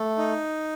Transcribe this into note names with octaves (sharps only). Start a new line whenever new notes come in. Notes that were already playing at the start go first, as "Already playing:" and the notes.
Already playing: A3
D#4